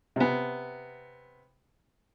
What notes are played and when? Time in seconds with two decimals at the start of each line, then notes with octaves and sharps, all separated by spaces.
0.16 C3 B3